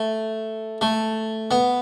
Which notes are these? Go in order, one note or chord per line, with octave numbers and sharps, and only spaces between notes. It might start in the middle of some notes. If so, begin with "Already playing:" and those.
Already playing: A3
A3
B3